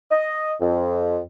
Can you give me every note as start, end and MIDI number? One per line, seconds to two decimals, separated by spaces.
0.11 0.53 75
0.61 1.19 41